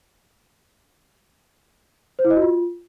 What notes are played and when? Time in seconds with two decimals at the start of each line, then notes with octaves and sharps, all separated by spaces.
2.19 C5
2.25 E4
2.30 D#5
2.36 F#4
2.42 F4